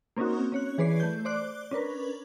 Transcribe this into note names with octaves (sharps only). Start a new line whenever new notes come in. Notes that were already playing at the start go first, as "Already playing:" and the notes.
A#3 C4 C#4 D#4 F#4
C#4 C#5 F#6
E3 G#4 B4 C#5 D5 C7
A3 G6
C5 D5 D6 F#6
C#4 D4 A#4 B4